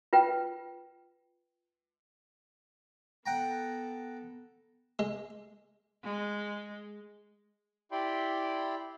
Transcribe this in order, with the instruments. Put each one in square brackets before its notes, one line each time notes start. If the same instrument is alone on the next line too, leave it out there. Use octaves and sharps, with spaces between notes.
[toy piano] F4 B4 G5
[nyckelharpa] B3 A4 [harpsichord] F#5 G5 A#5
[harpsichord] G#3
[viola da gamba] G#3
[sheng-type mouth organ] E4 G4 D5 G5 B5 C6